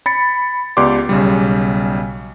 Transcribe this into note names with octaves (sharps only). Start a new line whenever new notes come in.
B5 A6 C#7
C#2 B3 G4 D5 C6 D6
B1 C#3 G3